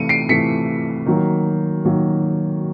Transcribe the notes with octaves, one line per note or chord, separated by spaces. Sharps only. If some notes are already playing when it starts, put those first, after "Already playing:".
Already playing: C3 E3 A3 C#7 D#7
C7 D7
C3 E3 A3 B6 C#7
D#3 F#3 A#3
D#3 F#3 A#3